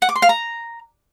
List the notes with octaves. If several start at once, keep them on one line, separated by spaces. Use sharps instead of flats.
F#5
D6
C6
F5
A#5